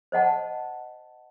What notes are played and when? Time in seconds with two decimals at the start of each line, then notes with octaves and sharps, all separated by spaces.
0.12 C5 D#5 F#5 A5